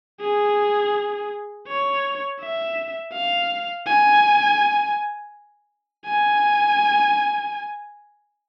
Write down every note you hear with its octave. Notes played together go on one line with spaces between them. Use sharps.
G#4
C#5
E5
F5
G#5
G#5